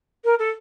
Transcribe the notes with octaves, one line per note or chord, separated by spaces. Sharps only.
A#4
A4